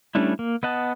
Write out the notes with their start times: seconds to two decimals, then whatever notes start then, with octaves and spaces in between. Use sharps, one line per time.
0.15 G3 A3 C#4 D4 E4
0.39 A#3
0.63 B3 D#5 F#5 A5